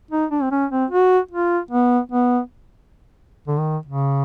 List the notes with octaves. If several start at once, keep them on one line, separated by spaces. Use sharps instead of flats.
D#4
D4
C4
C#4
C4
F#4
F4
B3
B3
D3
D#3
C#3